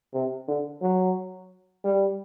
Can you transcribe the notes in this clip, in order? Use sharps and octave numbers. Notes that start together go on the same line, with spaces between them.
C3
D3
F#3
G3